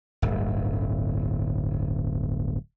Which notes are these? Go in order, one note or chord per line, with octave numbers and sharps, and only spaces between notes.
D1 G1